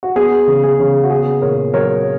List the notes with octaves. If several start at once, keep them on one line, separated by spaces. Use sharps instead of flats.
F#4
B3 G#4
C#3
G#4
C#3
F#4
B3 G#4
A#2 A#4 C#5
F#3 A#4 C#5